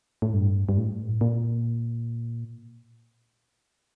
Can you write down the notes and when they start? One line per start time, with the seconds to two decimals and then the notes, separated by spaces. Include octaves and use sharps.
0.22 A2
0.34 G2
0.69 G2
0.78 A2
1.21 A#2